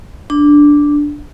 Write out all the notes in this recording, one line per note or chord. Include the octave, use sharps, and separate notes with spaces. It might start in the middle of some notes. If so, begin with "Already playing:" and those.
D4